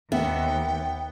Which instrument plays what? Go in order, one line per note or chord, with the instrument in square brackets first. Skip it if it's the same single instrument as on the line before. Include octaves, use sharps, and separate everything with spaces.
[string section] D#2 [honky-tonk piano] B3 F#5 [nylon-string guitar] E5 [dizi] G5